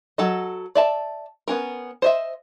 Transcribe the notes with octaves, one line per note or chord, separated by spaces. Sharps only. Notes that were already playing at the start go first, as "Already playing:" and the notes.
F#3 A4 D#5
D5 E5 A5
B3 C#4 A#4
C5 D#5 E5